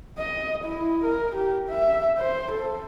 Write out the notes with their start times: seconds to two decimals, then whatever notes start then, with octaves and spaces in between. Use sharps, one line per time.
0.19 D#5
0.65 E4
1.05 A#4
1.36 G4
1.70 E5
2.18 C5
2.52 A4